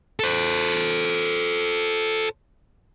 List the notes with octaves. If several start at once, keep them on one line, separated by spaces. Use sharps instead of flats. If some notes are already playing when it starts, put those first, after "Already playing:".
A4 C5